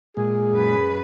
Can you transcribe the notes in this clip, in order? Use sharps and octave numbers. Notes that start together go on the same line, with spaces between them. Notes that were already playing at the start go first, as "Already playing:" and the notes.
A#2 G#3 G#4
F#2 B4